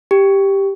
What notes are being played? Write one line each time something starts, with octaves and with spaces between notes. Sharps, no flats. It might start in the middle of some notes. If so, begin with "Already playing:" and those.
G4